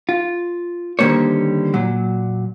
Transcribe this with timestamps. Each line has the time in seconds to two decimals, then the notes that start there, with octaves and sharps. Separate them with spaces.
0.09 F4
0.99 D3 D#3 G3 A#3 C5 C#5
1.74 A#2 F#3